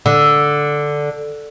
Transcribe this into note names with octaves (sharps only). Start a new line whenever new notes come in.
D3